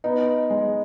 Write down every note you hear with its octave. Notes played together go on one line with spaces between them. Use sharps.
B3 D#4
G#3